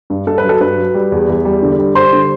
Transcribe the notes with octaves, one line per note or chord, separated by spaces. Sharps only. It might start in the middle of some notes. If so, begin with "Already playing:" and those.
G2
G2 A4
B4
F#3
A4
G2 B4
F#3
G3
E2
E2
G3
D3
G3
G3 C5 C6
D3